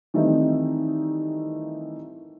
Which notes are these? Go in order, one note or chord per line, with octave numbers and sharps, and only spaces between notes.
D#3 E3 G3 A3 C4 D#4